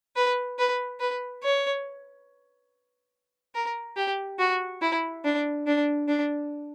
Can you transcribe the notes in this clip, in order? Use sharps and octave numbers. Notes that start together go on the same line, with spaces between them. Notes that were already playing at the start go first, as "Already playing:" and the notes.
B4
B4
B4
C#5
A#4
G4
F#4
E4
D4
D4
D4